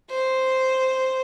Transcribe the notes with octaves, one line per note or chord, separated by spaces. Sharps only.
C5